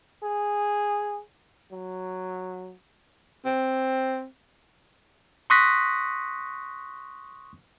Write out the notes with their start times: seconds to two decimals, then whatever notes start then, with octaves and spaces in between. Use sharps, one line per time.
0.23 G#4
1.72 F#3
3.45 C4
5.50 C6 C#6 D#6 F#6 A#6 B6